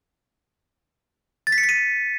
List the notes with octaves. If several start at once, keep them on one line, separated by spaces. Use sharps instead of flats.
A6
B6
C#7
B6
D#7